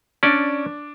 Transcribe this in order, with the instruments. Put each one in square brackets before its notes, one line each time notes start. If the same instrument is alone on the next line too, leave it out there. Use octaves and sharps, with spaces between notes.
[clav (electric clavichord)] C#4 D5 [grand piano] D4